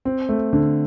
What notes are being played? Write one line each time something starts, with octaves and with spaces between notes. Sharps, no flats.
C4
A3
D3